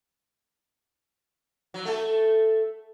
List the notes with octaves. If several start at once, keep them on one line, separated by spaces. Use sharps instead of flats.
F#3
A3 A4